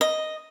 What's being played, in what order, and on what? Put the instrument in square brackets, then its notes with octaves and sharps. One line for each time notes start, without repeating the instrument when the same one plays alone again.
[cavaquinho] D#5